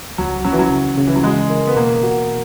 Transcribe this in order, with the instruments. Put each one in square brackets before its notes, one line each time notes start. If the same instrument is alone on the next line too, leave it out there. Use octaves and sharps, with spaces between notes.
[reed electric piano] C#2 [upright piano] F#3
[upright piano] F#3 [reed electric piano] C#4
[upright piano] E3
F#3
[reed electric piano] C#3
C#3
[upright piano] E3
F#3
[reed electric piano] E3 [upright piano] G#3
[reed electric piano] A#4
[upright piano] B3
[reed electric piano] B2 [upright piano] A#3
[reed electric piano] F#4